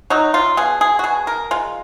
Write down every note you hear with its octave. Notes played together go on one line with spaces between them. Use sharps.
F#3 D#4
F4
B2 G#4
G#4
F#4
B2 G#4
A#4
G#3 F4